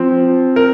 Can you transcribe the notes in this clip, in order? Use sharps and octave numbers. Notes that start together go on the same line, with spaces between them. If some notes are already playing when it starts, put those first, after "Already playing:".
Already playing: F3 C4
A#4